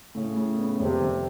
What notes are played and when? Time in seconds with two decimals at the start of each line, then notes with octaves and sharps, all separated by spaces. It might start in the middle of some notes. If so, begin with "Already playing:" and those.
0.15 A2 C#3
0.36 A2
0.58 B3
0.79 F1 C3
1.01 F1